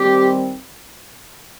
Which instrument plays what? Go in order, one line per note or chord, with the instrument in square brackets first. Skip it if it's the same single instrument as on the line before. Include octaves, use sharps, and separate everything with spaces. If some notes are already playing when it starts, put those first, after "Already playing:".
Already playing: [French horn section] D#3 G3 C4 [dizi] G4